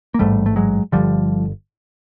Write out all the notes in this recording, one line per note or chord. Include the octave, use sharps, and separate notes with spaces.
A#3
A1 G#2 G3 A3
A3
F#3 G#3
G1 G2 D3 F3 G3